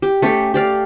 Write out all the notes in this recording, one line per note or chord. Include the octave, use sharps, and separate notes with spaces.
G4
A3 C#4 G4
G4 D5 F5